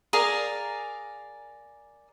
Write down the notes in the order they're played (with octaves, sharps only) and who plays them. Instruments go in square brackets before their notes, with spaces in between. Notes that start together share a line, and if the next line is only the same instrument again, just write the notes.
[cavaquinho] G#4 A#4 D5 F5